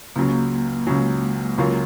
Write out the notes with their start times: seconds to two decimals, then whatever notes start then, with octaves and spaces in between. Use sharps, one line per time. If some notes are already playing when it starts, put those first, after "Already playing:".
0.16 C#2 C#3 F#3 A#3
0.87 C#2 C#3 F#3 G#3
1.58 C#2 C#3 F#3 A#3 F4